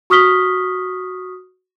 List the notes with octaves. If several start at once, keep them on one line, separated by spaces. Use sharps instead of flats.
F#4 C#6 D#6 F6 B6 G7